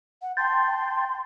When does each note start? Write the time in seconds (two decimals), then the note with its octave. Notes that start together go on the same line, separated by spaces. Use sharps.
0.22 F#5
0.37 G5 A5 C6